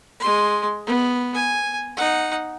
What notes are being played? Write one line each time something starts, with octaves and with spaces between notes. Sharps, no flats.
G#3 C6
B3
G#5
D#4 F#5